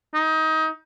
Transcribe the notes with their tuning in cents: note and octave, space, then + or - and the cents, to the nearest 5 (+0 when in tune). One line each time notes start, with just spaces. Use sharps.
D#4 +25